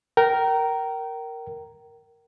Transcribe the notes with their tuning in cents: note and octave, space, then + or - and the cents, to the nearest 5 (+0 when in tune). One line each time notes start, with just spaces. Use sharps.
A#4 +0 G5 -30